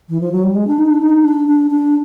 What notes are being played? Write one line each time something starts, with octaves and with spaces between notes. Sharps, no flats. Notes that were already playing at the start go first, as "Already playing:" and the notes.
E3
F3
F#3
G3
G#3
D4
D#4
D4
D#4
D4
D4
D4